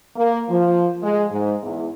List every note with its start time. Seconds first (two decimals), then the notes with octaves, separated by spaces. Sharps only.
0.16 A#3
0.49 F3
1.02 G#3
1.31 G#2
1.61 E2